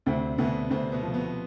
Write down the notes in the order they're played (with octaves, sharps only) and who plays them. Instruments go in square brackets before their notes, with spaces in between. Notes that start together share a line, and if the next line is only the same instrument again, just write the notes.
[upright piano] D2 [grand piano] C3 C4
[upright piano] D2 [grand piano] B2 B3
[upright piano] D2 [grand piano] C3 C4
[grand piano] B2 B3
[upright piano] F3
[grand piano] B2 B3